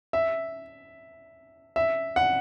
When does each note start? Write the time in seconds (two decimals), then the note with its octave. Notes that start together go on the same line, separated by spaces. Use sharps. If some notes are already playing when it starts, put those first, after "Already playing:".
0.13 E5
1.76 E5
2.16 F#5